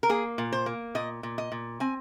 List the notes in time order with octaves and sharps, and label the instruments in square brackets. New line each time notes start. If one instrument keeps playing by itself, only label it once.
[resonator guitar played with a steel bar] A#4
A#3 G#4
A#2
C5
A#3
A#2 D#5
A#2
D#5
A#2
C4 G#5